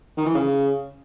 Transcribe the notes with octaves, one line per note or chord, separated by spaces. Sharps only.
D#3
E3
C#3